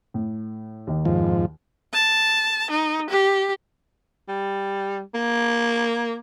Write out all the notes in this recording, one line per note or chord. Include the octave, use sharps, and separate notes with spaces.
A2
D#2 D#3
F2 G#2 F3
A5
D#4
G4
G3
A#3